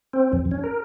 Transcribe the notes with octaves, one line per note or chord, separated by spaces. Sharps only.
C4
F2
C#4
A#4